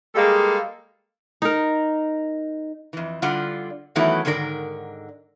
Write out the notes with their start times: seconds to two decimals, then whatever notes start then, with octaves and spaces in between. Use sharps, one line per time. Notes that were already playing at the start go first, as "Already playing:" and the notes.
0.15 G3 G#3 A#3 G#4 A4
1.42 D#4 A#4
2.93 F2 E3
3.22 D3 G3 F4 D5 F#5
3.95 D#3 E3 F#3 A3 B3 E4
4.25 G#2 D3 D#3 A#4 D5